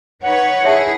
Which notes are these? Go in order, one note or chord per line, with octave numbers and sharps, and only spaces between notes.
D#4 B4 C#5 F#5
E4 G#4 C#5 E5 A5